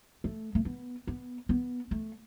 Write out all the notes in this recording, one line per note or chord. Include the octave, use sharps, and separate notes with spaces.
A3
A3
B3
B3
B3
A3